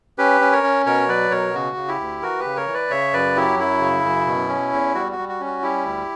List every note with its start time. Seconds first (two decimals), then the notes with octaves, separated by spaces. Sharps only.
0.18 C#4 G4 B4
0.41 C#4
0.52 A#4 C#5
0.63 C#4
0.86 B2 A#4 C#5
1.08 F#3 B4 D5
1.31 B2 A#4 C#5
1.54 C#3 F#4
1.76 C#3
1.88 E4 G4
2.00 D2
2.22 E3 F#4 A#4
2.40 G4 B4
2.45 C#3
2.56 A#4 C#5
2.67 E3
2.74 B4 D5
2.90 C#3 C#5 E5
3.13 F#2 B4 D5
3.36 F#3 E4 G4
3.58 F#2 E4
3.81 C#3
4.04 F#2
4.27 B2
4.49 C#4
4.73 E2
4.95 G3 F#4
5.12 F#4
5.18 G3
5.29 F#4
5.40 C#4
5.46 F#4
5.62 G3 E4 G4
5.85 D2